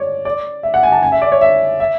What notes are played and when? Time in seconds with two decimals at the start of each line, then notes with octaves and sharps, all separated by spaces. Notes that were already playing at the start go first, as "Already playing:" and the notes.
Already playing: C#5 D5
0.25 D5
0.63 E5
0.74 F#5
0.83 G#5
0.92 A5
1.03 G#5
1.12 E5
1.22 D5
1.32 C#5
1.41 E5
1.80 E5